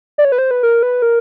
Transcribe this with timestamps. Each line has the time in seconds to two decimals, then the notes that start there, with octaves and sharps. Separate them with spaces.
0.18 D5
0.25 C#5
0.32 B4
0.38 C5
0.51 B4
0.63 A#4
0.83 B4
1.02 A#4